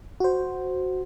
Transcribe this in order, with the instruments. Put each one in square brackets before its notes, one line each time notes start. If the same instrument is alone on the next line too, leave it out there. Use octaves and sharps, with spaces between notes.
[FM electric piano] F#4 C5